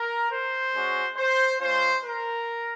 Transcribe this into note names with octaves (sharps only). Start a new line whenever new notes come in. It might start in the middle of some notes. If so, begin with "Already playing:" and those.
Already playing: A#4
C5
G#3 C#4 F#4
C5
G#3 C#4 F4 C5
A#4